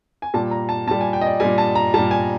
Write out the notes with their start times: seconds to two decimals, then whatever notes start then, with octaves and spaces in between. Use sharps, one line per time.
0.22 G#5
0.34 A#2 G3 A5
0.51 A#5
0.69 A5
0.87 A#2 A5
0.91 G3
1.01 G#5
1.13 G5
1.21 D#5
1.27 D5
1.40 A#2 G3 G#5
1.58 A5
1.75 A#5
1.94 A#2 G3 A5
2.11 G#5